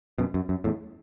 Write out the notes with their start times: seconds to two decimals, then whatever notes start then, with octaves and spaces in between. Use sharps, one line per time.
0.18 F#2 B2
0.34 F#2
0.49 F#2
0.64 E2 A2